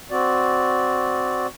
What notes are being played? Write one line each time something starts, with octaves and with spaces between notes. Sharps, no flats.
C4 F#4 D5